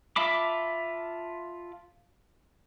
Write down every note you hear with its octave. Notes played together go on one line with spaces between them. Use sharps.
F4 E5 A5 B5 D6